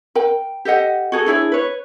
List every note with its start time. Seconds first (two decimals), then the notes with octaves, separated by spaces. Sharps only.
0.15 A#4 G5
0.65 G4 A4 D#5 F#5
1.12 F#4 G#4 A4
1.26 D4 E4 G#4 C#5
1.52 B4 C#5